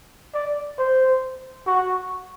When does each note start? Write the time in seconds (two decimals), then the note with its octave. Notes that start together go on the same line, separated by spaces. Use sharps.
0.34 D5
0.78 C5
1.67 F#4